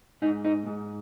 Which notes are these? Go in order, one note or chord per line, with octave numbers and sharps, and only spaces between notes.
G#2 D#4
D#4
G#2